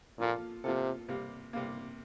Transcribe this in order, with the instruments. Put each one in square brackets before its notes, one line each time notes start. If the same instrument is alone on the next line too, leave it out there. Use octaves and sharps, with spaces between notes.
[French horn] A#2 [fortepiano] F3 A#3 F4 A4
[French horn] C3 [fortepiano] F3 A#3 F4 A4
[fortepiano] C3 G3 A#3
C3 G3 A#3